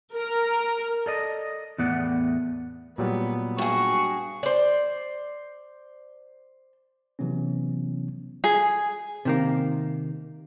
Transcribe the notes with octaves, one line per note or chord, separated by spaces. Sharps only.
A#4
A4 D5 D#5
E2 A2 B3 D5 F#5
A#2 F#3 G3 B3
G2 F#4 G#4 C#6
C5 D5
C3 E3 F#3 B3 C#4
G#4
C3 D#3 A#3